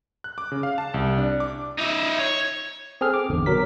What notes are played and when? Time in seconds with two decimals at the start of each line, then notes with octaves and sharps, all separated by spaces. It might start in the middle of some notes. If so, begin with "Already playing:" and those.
0.24 F#6
0.38 D6
0.52 C#3
0.63 F5
0.78 A5
0.94 C2
1.18 D4
1.40 D6
1.78 D#4 E5
2.18 C#5
3.01 C4 G#4 A4 F6
3.14 D6
3.29 G#1 E2 D3
3.46 B2 F#3 A#4 B6